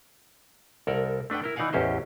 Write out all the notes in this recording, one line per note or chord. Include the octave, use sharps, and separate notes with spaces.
C2 A4 A#4 D5
A3 D4 B4 F#5 G5
E4 A#4
E3 D#4 D5 F5 F#5 G#5
A1 E2 C#4 G4 C5 D#5